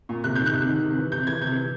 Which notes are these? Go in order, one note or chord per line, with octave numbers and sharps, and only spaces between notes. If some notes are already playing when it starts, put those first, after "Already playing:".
A#2
C3 F#6
D#3 G6
F#6
C3
D#3
C3
E3
C3 G6
E3 G#6
C3 G6
E3